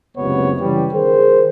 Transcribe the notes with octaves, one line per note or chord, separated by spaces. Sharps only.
F#1 C#2 C3 B3 C#5
C#3 E3 G3
D#3 G#4 A#4 C5